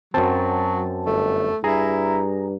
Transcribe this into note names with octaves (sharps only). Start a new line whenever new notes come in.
F#2 F#3 C4 A5
G1 A3
G2 E4 G#4 A#5